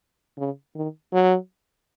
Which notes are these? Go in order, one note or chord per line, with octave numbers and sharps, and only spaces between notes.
C#3
D#3
F#3